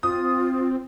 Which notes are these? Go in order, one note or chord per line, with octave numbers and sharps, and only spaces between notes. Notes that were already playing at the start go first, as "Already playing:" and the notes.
C4 F4 D#6